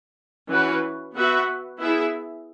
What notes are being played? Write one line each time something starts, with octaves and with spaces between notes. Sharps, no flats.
E3 C#4 F#4 B4
B3 F#4 B4 E5
B3 E4 G#4 E5